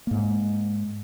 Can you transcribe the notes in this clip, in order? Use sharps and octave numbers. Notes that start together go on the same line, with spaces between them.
G#2 A#3